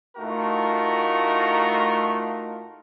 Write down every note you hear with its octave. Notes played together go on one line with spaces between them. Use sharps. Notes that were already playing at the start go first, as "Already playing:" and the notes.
A2 A3 D#4 F4 F#4 A#4